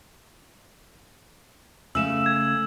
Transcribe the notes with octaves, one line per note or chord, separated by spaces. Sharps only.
C#3 A3 E6 E7
G#6